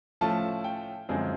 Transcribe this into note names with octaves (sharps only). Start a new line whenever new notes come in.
A2 F3 A3 C#4 A5
G5
F#2 D3 F3 G#3 C4